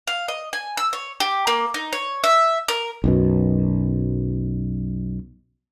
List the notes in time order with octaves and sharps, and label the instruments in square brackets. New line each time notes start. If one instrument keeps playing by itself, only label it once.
[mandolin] F5
D#5
G#5
E6
C#5
G4
A#3
D#4
C#5
E5
A#4
[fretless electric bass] B1 F#2 B2